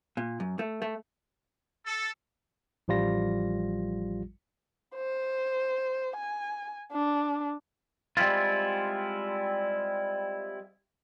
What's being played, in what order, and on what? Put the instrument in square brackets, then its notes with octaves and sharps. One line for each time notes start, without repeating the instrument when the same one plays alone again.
[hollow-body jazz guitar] A#2
F#2
A3
A3
[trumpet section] A4
[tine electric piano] A1 F3 G3 F4 A#6
[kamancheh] C5
G#5
D4
[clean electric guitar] G3 G#3 C4 E4 F4